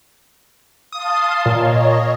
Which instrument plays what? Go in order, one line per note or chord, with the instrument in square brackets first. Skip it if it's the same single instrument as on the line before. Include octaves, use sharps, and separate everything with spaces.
[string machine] F5 A5 C6 [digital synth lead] D#6
[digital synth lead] A#2 [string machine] C#5 D#5